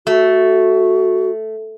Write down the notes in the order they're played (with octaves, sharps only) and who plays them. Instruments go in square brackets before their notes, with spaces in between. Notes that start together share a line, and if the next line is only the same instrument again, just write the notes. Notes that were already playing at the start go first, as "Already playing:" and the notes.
[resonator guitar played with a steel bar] A3 [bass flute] F#4